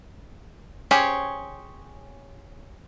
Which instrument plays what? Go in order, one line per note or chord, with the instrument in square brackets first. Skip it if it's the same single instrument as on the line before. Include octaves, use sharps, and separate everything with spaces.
[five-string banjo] C#4 G4 G#4 C5 C#5